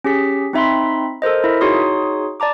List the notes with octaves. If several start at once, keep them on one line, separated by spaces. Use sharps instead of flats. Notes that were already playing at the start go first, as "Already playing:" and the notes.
C#4 G4 G#4 B6
C4 D#4 E5 B5 C6
A4 A#4 C5 D#5
E4 A#4 E5
D#4 F#4 G#4 C#5 C6 D#6
D5 A5 A#5 D6